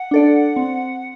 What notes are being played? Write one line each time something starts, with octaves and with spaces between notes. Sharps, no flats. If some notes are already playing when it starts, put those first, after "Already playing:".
Already playing: F#5
D4 A4 D5
C4